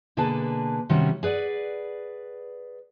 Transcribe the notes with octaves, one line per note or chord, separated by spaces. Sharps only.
B2 D3 A#3 G#4 B4 A5
C3 D#3 G3 B3 C#4 F#4
G#4 B4 D5 F#5